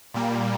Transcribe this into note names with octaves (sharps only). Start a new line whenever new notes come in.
A#2 G3 A#3